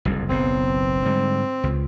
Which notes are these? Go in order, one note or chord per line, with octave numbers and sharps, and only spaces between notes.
F#1 C2 F2
F#1 B1 B3 C4
G#2 D3 G3
C#2